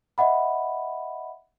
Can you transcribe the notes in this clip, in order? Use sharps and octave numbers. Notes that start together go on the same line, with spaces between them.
D#5 E5 F#5 B5